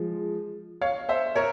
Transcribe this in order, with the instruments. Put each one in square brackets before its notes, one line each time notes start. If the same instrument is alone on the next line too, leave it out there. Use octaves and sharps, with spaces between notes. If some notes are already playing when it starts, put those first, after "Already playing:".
Already playing: [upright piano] F3 G#3
[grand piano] C#5 F5
C5 E5
A#4 C#5